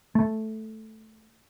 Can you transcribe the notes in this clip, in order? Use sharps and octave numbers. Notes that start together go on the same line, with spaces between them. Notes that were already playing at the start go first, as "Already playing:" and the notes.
A3